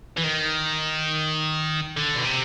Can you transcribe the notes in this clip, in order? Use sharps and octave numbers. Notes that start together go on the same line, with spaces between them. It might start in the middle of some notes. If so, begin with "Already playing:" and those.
E3
D#3
D3
B2
C3